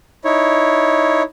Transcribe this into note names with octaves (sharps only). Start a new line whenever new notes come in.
D#4 E4 C#5